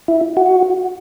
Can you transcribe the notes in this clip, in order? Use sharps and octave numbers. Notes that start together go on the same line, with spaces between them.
E4
F#4